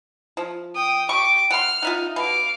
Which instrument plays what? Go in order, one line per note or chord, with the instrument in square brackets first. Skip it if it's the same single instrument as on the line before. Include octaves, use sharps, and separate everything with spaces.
[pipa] F3
[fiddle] G5 D#6
[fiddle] G4 D6 [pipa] C#6
[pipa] F#5 C6 [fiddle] F6
[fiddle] D#4 [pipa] F4 E5 F#5
[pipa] B2 [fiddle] F5 D6